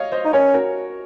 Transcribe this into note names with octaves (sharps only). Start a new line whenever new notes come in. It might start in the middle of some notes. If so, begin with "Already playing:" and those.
Already playing: C#5 D#5 F5
C5 D#5
D#4
C#4 A#4 C#5
F#4 A#4